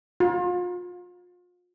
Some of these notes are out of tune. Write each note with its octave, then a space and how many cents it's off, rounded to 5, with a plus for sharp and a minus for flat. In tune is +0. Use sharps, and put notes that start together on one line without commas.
F4 +35